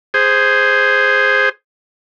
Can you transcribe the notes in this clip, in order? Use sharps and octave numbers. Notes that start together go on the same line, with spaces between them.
G#4 C5